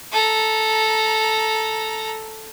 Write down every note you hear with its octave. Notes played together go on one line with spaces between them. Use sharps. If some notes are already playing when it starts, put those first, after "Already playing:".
A4 A#5